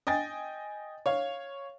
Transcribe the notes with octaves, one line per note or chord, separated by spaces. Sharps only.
D#5 G5 G#5 A6
C#5 F5